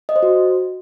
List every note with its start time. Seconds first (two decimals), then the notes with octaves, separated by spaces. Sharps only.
0.09 D#5
0.16 C5
0.23 F#4